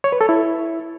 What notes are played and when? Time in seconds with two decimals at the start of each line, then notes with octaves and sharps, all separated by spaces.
0.04 C#5
0.12 B4
0.21 A4
0.29 E4